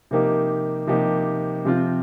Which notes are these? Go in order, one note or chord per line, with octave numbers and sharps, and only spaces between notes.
C3 F3 A#3 D#4 G4
C3 F3 A#3 D#4 G4
C3 F3 C4 F4